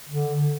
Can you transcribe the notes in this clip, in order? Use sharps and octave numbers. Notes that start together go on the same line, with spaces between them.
D3